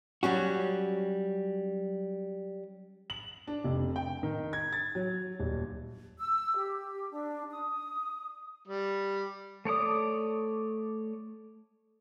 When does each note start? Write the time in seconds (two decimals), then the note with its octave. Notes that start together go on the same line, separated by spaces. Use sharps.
0.23 F#3 G3 C#4 F#4
3.10 F#7
3.47 D4
3.64 F1
3.96 G5
4.23 D#3
4.53 G#6
4.73 A6
4.95 F#3
5.40 D#1
6.19 E6
6.56 G4
7.11 D4
7.51 D#6
8.68 G3
9.65 A3 C#5 D5 D#6